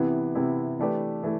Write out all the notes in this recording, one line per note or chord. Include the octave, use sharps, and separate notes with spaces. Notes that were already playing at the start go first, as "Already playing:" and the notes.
Already playing: C3 E3 B3 E4 G4
C3 E3 B3 E4 G4
E3 A3 D4 G4 B4
E3 A3